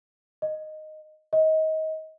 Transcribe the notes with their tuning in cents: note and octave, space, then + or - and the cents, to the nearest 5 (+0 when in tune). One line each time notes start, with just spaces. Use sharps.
D#5 -5
D#5 +25